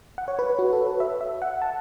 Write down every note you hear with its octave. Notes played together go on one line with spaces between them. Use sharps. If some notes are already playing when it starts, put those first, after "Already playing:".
F#5
C#5
B4
F#4
A4
B4
E5
E5
F#5
A5